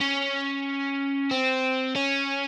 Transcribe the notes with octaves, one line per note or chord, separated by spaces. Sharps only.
C#4
C4
C#4